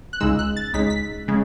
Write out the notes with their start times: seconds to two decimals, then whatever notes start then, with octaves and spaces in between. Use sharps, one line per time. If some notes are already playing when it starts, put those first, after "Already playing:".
0.13 F#6
0.20 C#2 C#3 G#3 D#4 E6
0.39 F#6
0.56 A6
0.74 C#2 C#3 G#3 D#4 B6
0.90 B6
1.28 C#3 G#3